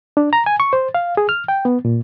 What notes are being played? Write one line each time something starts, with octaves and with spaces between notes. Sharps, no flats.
D4
A#5
G#5
C#6
C5
F5
G#4
F6
G5
B3
A#2